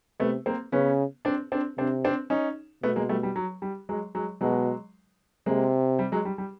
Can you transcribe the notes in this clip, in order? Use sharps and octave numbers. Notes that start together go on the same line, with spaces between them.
C3 A3 B3
A#3 C4
C#3 B3 C#4
C4 D4
C4 D4
C3 C4 D4
C4 D4
C#4 D#4
B2 A3 B3
G#3 A#3
G3 A3
G3
F#3
G3
F#3 G#3
F#3 G#3
B2 F#3 G#3
C3 G#3 A#3
G3
F#3 G#3
G3
G3